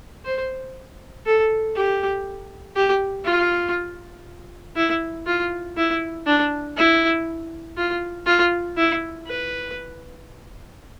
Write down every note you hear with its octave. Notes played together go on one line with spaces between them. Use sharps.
C5
A4
G4
G4
F4
E4
F4
E4
D4
E4
F4
F4
E4
B4